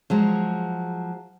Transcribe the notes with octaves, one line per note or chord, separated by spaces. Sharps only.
F3 F#3 G#3